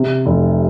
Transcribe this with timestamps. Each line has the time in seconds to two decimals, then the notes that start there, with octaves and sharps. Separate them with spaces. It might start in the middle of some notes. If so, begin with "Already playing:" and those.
Already playing: C3
0.26 F1